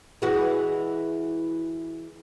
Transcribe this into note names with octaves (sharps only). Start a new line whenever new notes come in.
E3 G#3 F#4